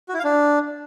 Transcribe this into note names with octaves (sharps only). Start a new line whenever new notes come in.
F#4
E4
F5
D4